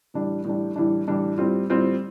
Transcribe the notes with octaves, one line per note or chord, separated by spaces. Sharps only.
A2 E3 G3 D4
A2 E3 G3 D4
A2 E3 G3 D4
A2 E3 G3 D4
A2 G3 C4 F4
A2 G3 C4 F4